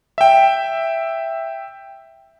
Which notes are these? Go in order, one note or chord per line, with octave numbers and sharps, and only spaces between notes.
E5 G5